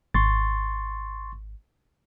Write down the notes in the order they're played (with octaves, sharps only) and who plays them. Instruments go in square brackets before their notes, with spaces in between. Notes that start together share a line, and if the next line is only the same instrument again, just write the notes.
[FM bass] G#1 [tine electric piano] C6 C#6 A6